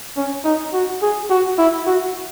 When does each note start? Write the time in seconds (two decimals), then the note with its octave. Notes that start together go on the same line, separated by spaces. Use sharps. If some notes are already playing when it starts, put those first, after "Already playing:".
0.17 C#4
0.44 D#4
0.73 F#4
1.02 G#4
1.30 F#4
1.58 E4
1.87 F#4